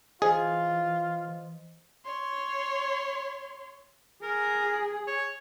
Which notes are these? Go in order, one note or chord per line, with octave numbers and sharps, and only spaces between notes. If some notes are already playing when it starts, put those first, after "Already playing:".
E3 F4 G#4 C5 D#5
C#5 C6
G#4 A#4
C#5